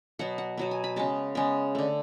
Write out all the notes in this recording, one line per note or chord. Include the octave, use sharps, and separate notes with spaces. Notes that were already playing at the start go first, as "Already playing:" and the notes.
B2 F#3 B3 F#5
F#5
B2 F#3 B3
G#5
B5
C#3 G#3 B3 A5
C#3 G#3 B3
D3 A3